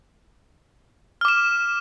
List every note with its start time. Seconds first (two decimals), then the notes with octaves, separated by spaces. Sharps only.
1.21 F6
1.25 D6
1.28 E7